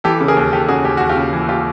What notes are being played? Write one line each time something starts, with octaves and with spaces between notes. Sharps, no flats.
E3 G4 A4
C#3
G#4 A#4
D#2
D#2 G4 A4
C#3 F#4 G#4
D#2 G4
D#2 F#4
F4 G4
C#3
E3
F4 G4